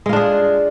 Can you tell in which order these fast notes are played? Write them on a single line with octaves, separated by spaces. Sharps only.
G#3 F4 D4 G#4